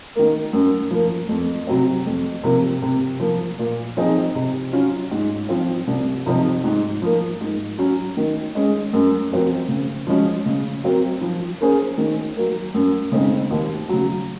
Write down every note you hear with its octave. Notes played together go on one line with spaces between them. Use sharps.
D#3 A#3
F#2
F3 A#3
F2
C3 F#3 C4
F2
C3 F3 A#3
C3
F3 A#3
A#2
F3 C4 D#4 G#4
C3
F#3 C#4 F4
G#2
F3 C4 F4
C2
C3 F3 C4 D#4
G#2
F3 A#3
G#2
F#3 C#4
D#3
G#3 C#4 G#4
F#2
F3 C4 F#4 A#4
C#3
F3 G#3 C#4 F#4
C#3
F#3 C4 F#4 A#4
F3
A#3 C#4 G#4 C5
D#3
F#3 A#3
F#2
C#3 G#3 C4 D#4
D#2
C#3 F#3